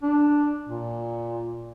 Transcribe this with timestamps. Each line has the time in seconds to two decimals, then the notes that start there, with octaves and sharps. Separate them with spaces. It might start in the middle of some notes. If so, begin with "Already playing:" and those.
0.03 D4
0.67 A#2